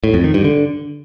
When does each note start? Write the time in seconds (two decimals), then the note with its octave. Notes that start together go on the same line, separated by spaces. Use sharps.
0.04 A2
0.14 F2
0.24 D#3
0.34 G2
0.44 D3